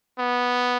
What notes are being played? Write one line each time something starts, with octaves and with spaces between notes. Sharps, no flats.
B3